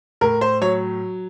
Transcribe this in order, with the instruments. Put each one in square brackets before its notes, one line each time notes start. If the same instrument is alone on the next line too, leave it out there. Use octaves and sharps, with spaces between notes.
[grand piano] A2 A#4
C5
F#3 C#5